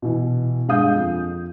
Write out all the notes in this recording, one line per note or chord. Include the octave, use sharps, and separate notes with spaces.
B2 E3
G2 G#3 F5 D#6 G6
F2